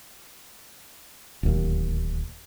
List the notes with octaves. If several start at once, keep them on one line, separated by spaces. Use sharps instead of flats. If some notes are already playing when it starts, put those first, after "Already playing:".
D1 D#2